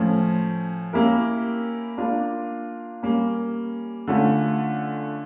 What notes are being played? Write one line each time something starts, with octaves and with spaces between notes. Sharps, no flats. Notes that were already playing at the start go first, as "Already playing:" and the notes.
Already playing: A2 F3 C#4
A#3 C#4 E4 G4 A#4
A#3 D4 F4
G3 A#3 C#4
D3 A3 C#4 F4